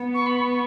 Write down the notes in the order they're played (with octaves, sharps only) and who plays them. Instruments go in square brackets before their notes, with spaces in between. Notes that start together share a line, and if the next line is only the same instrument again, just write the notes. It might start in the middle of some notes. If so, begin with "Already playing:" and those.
Already playing: [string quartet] B3
[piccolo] C#6
B5
C#6